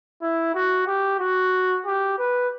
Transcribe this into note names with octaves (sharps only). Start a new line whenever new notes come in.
E4
F#4
G4
F#4
G4
B4